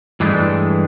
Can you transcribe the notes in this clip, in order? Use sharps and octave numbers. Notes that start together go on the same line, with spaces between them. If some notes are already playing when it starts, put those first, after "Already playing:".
G2 E3 G#3 A3 D4